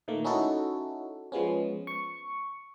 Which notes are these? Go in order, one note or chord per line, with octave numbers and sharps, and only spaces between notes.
A#2 D#3 A3 A#3
C#4 D#4 E4 F#4 A4
F3 G#3 B3 C#4
C#6